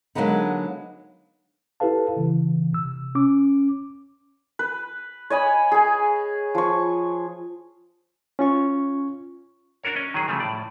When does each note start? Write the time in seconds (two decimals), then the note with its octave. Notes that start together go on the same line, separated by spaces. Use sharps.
0.15 D3 F#3 G#3 A#3 B3 D#4
1.80 E4 G4 A4 B4 F5 A5
2.17 C#3 E3
2.73 C3 E6
3.15 C#4 D6
4.59 B4
5.30 C#5 D#5 G#5 B5
5.72 G#4 G#5
6.55 F3 C#6
8.39 C#4 F4 C#6
9.83 D4 F#4 A#4 C#5
9.96 C#4 D#5
10.14 D#3 F#3 G#4
10.28 C#3 F3 G3 A3
10.40 A2 D5